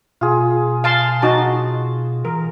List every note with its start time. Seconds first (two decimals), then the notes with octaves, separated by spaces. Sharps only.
0.21 B2 F4 G#4
0.84 F5 A5 C6
1.22 D#4 F#4 A5
2.25 E3 A#4